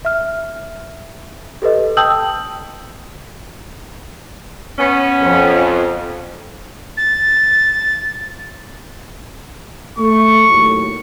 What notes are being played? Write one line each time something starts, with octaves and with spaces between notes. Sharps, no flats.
E5 F6
G4 A4 B4 D#5
G5 A5 D#6 E6 G6 F#7
B3 C#4
F2
A6
A3 C#6
D#2 A2 F#3